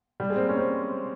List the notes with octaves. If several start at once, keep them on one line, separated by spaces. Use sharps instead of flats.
G3
G#3
C4
A#3
C#4
C4